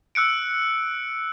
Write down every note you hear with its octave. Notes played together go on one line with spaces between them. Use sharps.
E6 F#6 C#7 D7